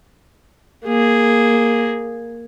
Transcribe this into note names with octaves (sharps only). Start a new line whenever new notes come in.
A#3 G#4